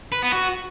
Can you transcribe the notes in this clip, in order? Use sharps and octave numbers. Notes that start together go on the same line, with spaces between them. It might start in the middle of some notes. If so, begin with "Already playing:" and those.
B4
B3
F#4